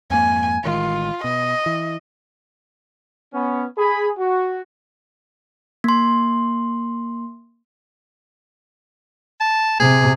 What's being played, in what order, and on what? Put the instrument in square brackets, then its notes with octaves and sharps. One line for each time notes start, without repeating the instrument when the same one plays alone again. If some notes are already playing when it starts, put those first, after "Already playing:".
[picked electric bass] F2 G#2 A#3 [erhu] G#5
[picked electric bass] A1 D#3 G#3 [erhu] F4
[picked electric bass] B2 [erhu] D#5
[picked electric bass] E3
[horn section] B3 C#4
G#4 B5
F#4
[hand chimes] A#3 C6
[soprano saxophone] A5
[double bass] C3 [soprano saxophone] G#4